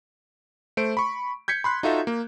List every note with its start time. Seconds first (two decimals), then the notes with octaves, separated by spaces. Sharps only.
0.77 A3 C5 D7
0.97 B5 C#6
1.48 G6 G#6 B6 C#7
1.64 B5 C6 F#6
1.83 D#4 F4 F#4 A4 E5
2.07 A#3